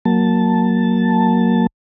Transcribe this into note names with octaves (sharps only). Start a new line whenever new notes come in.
F#3 A#3 A5